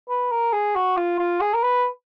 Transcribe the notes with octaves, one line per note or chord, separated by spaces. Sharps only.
B4
A#4
G#4
F#4
F4
F4
G#4
A#4
B4